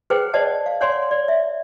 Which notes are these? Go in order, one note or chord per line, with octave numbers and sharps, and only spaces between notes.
G#4 B4 C5 F#5 G5
C5 D5 D#5 F#5 A5
F5
C#5 D5 F#5 G#5 C6
D5
E5